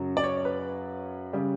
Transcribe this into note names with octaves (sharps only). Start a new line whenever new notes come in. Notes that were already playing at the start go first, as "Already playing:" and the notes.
Already playing: F#2 C#3 F#3
D5
C#5
B4
C#3 G3